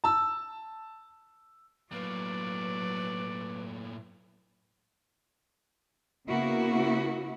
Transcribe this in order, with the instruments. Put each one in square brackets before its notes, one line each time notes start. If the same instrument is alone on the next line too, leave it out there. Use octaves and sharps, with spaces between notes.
[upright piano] A5 E6
[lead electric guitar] A2 A#3 [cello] F#3 [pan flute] B4 [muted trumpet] D5
[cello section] C#3 A#3 B3 E4 F#4